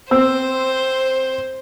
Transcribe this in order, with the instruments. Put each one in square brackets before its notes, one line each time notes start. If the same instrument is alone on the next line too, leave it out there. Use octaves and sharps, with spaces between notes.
[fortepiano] C4 E6 [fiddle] C5